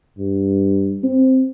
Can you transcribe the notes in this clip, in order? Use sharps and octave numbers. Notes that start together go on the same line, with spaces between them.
G2
C4